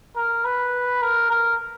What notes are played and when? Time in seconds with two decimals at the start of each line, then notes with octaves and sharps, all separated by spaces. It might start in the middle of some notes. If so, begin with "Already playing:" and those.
0.16 A#4
0.45 B4
1.02 A#4
1.30 A#4